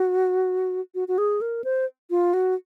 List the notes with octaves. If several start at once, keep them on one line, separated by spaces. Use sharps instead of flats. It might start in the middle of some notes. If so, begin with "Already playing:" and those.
Already playing: F#4
F#4
F#4
G#4
A#4
C5
F4
F#4